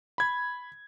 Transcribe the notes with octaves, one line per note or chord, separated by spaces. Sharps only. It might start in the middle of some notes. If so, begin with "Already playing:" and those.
B5 G#6